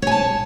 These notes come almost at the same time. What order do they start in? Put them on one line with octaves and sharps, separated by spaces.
C#5 G#5 A5